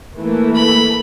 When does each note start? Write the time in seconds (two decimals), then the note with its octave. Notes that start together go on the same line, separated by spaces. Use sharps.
0.17 E3 A3 A#3
0.55 B5